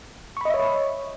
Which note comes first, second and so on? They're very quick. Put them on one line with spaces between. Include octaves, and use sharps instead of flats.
C#6 B5 D#5 E5 C#5